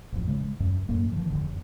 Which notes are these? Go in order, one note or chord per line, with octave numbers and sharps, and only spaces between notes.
A1 F2
C#3 G#3
F#2
F#2 A2 A#3
D#3 F3
F1 C#2 D3